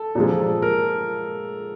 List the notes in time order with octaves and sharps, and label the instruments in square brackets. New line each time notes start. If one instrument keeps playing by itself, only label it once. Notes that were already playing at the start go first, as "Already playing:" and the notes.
Already playing: [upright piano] A4
[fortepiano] A#2 F3 G#3
[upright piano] A#4